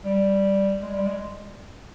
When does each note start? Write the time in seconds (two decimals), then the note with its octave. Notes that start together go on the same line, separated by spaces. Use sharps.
0.04 G3
0.81 G#3
0.94 G3
1.07 G#3